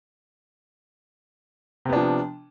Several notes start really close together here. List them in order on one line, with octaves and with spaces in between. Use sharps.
C3 B3 D4 F3